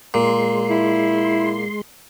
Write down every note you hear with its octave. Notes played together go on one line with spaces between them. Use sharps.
A#2 G#3 C6
E4